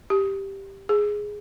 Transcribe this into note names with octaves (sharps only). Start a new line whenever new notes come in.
G4
G#4